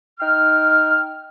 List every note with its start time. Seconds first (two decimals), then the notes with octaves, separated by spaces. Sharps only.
0.20 D#4 G5 F6